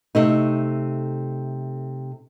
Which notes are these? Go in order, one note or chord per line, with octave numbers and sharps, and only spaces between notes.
C3 A3 D#4